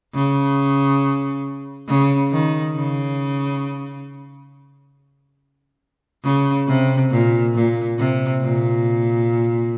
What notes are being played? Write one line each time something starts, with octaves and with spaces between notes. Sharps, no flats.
C#3
C#3
D#3
C#3
C#3
C3
A#2
A#2
C3
A#2